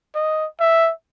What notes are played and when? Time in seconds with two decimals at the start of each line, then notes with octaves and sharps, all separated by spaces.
0.15 D#5
0.60 E5